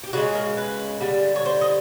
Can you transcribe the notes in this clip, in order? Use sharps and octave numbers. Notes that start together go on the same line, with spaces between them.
G4
C#3 E3 G#3 F#4
A#4
B4
D3 G3
C#5
C5
D#5